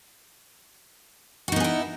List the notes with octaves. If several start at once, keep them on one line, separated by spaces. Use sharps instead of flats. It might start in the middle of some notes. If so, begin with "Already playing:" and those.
B3 D#4 E4 F#4 G#4